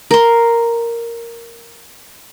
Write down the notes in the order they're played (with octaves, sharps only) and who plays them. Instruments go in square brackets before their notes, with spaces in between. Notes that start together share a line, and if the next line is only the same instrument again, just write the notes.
[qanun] A#4 C6